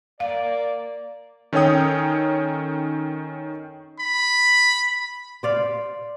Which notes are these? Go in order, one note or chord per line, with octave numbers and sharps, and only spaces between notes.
A#3 D5 F5
D#3 C#4 A4 C#5 G5 D#6
B5
C5 D5 F5